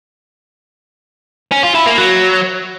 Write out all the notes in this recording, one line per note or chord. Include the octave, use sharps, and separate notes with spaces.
C#4
F4
E4
A#3
F#3